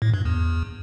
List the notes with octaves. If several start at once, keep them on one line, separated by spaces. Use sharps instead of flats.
A2
G2
E2